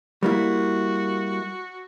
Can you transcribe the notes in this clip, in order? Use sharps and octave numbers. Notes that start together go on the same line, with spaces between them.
G3 A#3 E4 F#4